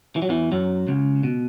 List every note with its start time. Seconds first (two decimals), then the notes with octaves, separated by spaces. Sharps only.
0.16 E3
0.22 F#3
0.29 E2 E3
0.52 F#2 F#3
0.87 C#2 C#3
1.23 B2